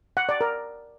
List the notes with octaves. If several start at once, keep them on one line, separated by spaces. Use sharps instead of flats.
F#5
D5
A#4